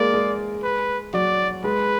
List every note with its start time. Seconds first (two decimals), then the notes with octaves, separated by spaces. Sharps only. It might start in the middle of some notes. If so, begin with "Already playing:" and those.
Already playing: G#3 A#3 A#4 D5
0.14 G#3 G#4
0.63 B4
1.13 F#3 F#4 D5
1.63 G#3 G#4 B4